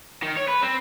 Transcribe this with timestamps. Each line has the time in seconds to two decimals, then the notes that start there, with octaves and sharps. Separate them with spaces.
0.22 D#3
0.36 C#5
0.48 B4
0.62 C4